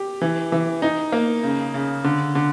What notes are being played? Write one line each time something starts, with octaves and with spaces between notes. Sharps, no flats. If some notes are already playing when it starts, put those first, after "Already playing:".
Already playing: G4
E3
E3
D#4
A#3
C#3
C#3
D3
D3